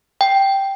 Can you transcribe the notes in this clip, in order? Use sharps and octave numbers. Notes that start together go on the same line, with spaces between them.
G5